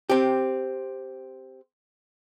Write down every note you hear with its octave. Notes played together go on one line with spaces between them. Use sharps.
C4 G4